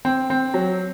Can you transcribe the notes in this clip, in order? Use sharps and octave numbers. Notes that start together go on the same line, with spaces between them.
C4
C4
F#3